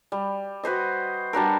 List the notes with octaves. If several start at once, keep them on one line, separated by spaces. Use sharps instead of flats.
G3
F#4 B4 C5 D#5
G3 D4 F#4 A#4